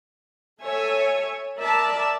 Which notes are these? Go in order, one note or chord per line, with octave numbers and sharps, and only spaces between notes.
A4 C#5 E5 G#5
A#4 D5 E5 A5